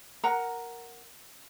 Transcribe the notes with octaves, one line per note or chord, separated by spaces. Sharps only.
A#4 F#5 A#5